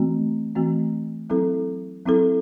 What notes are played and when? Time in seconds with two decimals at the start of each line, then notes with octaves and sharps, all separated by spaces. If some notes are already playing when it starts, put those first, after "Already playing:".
Already playing: E3 A3 C4 F#4
0.55 E3 A3 C4 F#4
1.30 F#3 C4 E4 A4
2.05 F#3 C4 E4 A4